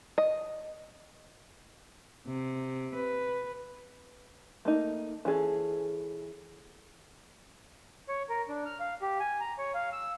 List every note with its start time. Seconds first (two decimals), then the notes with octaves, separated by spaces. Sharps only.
0.18 D#5
2.27 C3
2.95 B4
4.65 A3 A#3 D#4
5.25 E3 C#4 G#4 A4
8.09 C#5
8.29 A#4
8.49 D4
8.66 F6
8.80 F5
9.02 G4
9.20 G#5
9.40 A#5
9.58 C#5
9.75 F5
9.93 E6